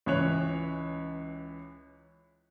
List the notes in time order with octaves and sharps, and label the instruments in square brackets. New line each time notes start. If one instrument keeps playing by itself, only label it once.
[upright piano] C#2 E3 C#4 C#5 F#6 F7